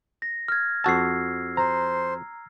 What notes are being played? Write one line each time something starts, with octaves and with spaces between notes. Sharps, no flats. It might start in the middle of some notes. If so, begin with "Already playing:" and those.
A#6
F6 G#6
F2 F#4 A5 E6 C7
C5 A#5